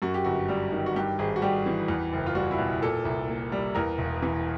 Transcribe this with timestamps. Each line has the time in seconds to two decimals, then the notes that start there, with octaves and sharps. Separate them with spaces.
0.02 F#2 F#4
0.14 G4
0.24 G1 F#4
0.48 G3
0.72 D#3
0.86 F#4
0.96 G2 G4
1.19 G#1 G#4
1.36 F#4
1.42 G3 G4
1.66 E3
1.88 E2
2.13 F#1
2.26 F4
2.35 G3 F#4
2.51 E4
2.59 B2
2.82 A#2 A4
3.05 C2
3.28 A#3
3.52 G3
3.75 E2 A#4
3.98 E1
4.22 E3